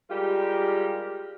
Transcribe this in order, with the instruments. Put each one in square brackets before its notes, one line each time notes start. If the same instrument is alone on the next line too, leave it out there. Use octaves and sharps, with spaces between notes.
[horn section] G3 G#3 F4 G4 A#4